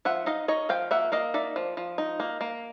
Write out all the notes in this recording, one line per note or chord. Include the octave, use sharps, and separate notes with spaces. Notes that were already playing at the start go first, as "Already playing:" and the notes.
F3 E5 F#5
D#4 D#5 F5
D#4 C#5 D#5
F3 F5 G5
A#3 E5 F#5
A#3 D#5 F5
D#4 D5 E5
F3
F3
D#4
A#3
A#3